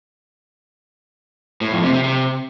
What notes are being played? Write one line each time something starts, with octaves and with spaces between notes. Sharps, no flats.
A2
F2
C3
C3
C3